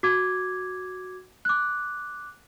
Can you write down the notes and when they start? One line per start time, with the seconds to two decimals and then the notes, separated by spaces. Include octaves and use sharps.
0.03 F#4 D6 G#6
1.45 D6 F#6